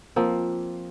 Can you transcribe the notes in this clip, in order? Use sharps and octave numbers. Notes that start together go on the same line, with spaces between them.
F3 A#3 C4